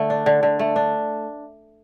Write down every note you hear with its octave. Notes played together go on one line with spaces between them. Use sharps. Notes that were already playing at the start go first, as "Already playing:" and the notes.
Already playing: D3 A3
D4
D3
D3
A3
D4